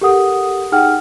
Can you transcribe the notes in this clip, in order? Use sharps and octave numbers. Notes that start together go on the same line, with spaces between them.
G4 A4 A#4 F#5 D#6
D#4 G#4 F#5 G5 F6